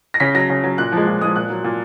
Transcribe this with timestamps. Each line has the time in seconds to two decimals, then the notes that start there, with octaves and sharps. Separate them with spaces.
0.14 A#6
0.20 C#3 B6
0.34 F#3 A#6
0.50 C#3
0.64 F#3
0.78 A#2 F#6
0.92 F3 G#3
1.07 A#2
1.21 F3 G#3 D#6
1.36 A#2 F#6
1.50 F#3
1.64 A#2